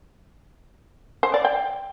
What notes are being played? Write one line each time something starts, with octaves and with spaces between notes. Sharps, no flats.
C5
D5
G5